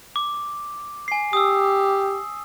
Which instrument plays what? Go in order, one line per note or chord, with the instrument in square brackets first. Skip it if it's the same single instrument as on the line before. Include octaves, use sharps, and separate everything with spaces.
[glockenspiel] D6
G#5 C7
[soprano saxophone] G4 [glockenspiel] D#6 E6